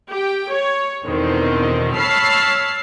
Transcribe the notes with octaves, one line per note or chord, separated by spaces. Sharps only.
G4 G5
C#5
E2 B2 D3 D#3 C4
C#5 A5 B5 E6 F6 C7